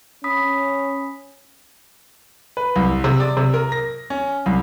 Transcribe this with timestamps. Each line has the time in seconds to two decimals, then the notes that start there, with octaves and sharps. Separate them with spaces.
0.24 C#4 B5 D#6 B6
2.57 B4
2.76 C2
3.04 C3
3.20 D5
3.37 C3
3.54 A#4
3.72 A#6
4.10 C#4
4.46 C2